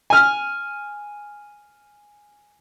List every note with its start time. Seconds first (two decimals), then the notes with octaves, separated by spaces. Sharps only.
0.10 G#5 F6